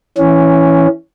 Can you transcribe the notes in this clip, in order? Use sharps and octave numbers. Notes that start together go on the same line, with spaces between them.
E3 C#4